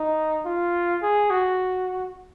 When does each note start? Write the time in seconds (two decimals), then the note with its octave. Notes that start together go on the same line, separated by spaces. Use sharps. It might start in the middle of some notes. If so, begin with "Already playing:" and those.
Already playing: D#4
0.46 F4
1.02 G#4
1.30 F#4